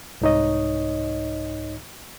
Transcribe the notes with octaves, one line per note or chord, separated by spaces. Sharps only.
C2 G#2 D#4 C#5 D#5